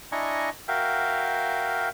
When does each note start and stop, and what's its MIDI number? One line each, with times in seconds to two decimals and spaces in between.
0.12 0.49 62
0.12 0.49 64
0.12 0.49 75
0.12 0.49 80
0.12 0.49 82
0.12 0.49 85
0.68 1.89 66
0.68 1.89 70
0.68 1.89 76
0.68 1.89 77
0.68 1.89 79